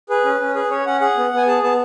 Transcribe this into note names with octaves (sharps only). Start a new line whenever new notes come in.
G#4 B4
C#4
C#4
G#4 B4
C#4 C#5
C#4 F#5
G#4 F#5
B3
B3 G#5
G#4 A5
B3 A5